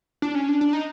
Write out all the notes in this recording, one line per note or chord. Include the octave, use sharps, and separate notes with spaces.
D4
C#4
D4
D4
D#4